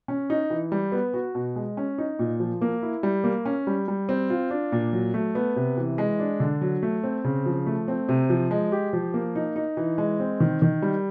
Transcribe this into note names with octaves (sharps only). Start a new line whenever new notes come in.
C#4
D#4
E3
G3
B3
F#4
B2
G#3
C#4
D#4
A#2
F3
A#3
E4
G3
A#3
C#4
G3
G3
C4
F4
D4
A#2
F#3
A3
B3
C3
E3
G#3
D4
D3
F#3
A3
C4
C#3
F3
A3
C4
C3
F3
G#3
G4
F3
A#3
D#4
D#4
E3
G#3
C4
D#3
D#3
G3